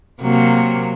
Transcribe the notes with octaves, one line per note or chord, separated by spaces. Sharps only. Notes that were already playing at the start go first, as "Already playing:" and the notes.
C3 F#3 A#3